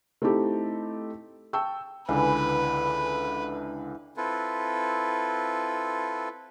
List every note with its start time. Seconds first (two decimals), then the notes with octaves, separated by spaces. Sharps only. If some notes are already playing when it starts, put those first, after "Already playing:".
0.22 A3 C4 D#4 E4 G4 A4
1.53 G5 A5 C#6 E6
2.09 C#2 D3 E3 B4
4.17 C4 E4 F4 A4 B4